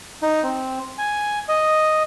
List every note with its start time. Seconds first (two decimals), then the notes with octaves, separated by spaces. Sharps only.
0.22 D#4
0.43 C4
0.98 G#5
1.48 D#5